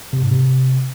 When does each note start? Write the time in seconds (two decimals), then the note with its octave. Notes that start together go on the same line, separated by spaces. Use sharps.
0.13 C3
0.22 G#2
0.32 C3